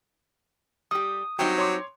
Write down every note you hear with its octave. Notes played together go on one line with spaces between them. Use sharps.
G3 G4 D#6
F#3 G3 C4 D#4 G5
C#5 C6 D6